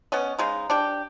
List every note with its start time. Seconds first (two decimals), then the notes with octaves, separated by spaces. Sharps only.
0.12 B3 C#4 D#5
0.39 C#3 G#3 D#4
0.70 D4 G4